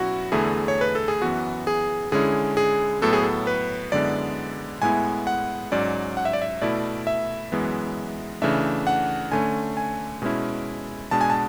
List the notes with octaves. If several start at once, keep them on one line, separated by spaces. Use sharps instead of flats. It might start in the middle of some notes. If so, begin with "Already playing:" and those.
Already playing: B2 F#3 C#4 E4 F#4
E2 D3 A3 E4 G#4
C#5
B4
A4
G#4
F#2 E3 B3 F#4
G#4
D3 G#3 C#4 E4 G#4
G#4
A2 F#3 B3 A4
G#4
A4
B4
F#2 D3 G#3 B3 E4 D5
A2 G#3 B3 E4 G#5
F#5
G#2 F#3 C#4 D5
F#5
E5
D5
E5
B2 A3 E4 D5
E5
F#2 E3 G#3 B3
C#3 E3 A3 D4 E5
F#5
D3 A3 C#4 G#5
G#5
B2 G#3 C#4 E4
B2 G#3 B3 D4 A5
G#5
A5